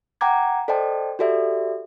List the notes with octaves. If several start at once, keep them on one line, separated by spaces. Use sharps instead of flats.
F#5 G5 A#5 D6 G#6
A4 C5 D5 D#5 G5 A5
F#4 G4 A4 D5 E5